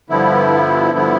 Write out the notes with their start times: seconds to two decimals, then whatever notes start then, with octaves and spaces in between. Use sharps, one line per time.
0.10 G2 D3 F3 B3 E4
0.91 G2 D3 F3 B3 E4